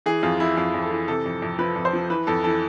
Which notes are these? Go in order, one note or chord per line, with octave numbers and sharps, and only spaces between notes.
E3 G#4
F2 F4
E3 E4
F2 F4
F2
A4
E3
C3 A4
F2
F2
F3 B4
F2
C5
F3
E3 B4
F2 A4
E3 A4